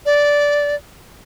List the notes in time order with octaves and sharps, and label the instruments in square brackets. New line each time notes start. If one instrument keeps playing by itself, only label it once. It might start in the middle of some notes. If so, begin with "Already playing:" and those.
[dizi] D5